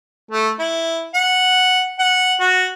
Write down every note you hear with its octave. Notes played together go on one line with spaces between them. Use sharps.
A3
E4
F#5
F#5
F#4